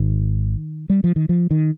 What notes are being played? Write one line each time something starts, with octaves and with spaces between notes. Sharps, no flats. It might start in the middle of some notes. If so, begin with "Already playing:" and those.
Already playing: G#1 G#2 D#3
G3
F3
D#3
F3
D#3